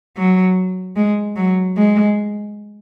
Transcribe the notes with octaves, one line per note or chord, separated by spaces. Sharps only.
F#3
G#3
F#3
G#3